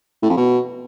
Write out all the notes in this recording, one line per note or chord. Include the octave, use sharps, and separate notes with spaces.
A2
F2
B2